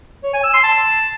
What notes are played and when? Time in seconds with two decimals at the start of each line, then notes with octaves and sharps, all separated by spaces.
0.23 C#5
0.34 G#5
0.44 E6
0.54 C6
0.64 A5